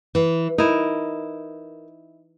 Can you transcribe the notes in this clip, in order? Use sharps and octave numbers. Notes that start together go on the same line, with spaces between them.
E3
D#4 E4 A#4